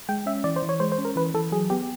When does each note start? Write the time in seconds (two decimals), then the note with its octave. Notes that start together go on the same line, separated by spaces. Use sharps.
0.09 G#3 G5
0.26 C#4 E5
0.44 E3 D5
0.56 C5
0.62 E3
0.69 C#5
0.80 G#3 C5
0.92 C5
0.98 C#4
1.05 A#4
1.16 E3 B4
1.34 E3 A4
1.52 F#3 G#4
1.70 B3 G4